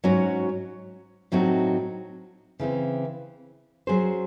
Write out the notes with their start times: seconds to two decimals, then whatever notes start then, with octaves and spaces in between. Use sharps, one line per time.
0.04 G#2 F#3 C#4 F#4 C#5
1.32 A2 F#3 C4 D#4 F#4
2.59 C#3 E3 C4
3.87 F#3 C#4 G#4 C5